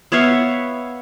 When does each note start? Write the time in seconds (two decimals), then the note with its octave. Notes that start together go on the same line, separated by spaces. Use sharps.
0.12 B3 C#5 E5 F5